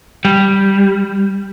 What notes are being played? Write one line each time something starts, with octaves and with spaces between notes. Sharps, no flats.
G3